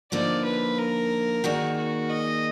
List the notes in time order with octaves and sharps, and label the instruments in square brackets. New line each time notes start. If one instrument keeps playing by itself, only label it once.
[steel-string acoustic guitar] D3 F3 A#3 D#4 [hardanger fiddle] D5
[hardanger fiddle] B4
A#4
[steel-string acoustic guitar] D#3 A#3 D#4 G#4 D5 [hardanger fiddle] F#4
[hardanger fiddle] F#4
D#5